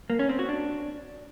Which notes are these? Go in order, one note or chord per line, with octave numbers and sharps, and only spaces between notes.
A#3
C#4
C4
F#4
D4